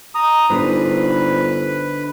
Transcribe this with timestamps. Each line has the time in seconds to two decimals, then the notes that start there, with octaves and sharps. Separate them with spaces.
0.15 A#5 D#6
0.50 G1 D3 D#4 B4 C5